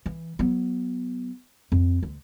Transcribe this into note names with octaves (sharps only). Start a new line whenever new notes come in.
E3
F#3 B3
F2
D2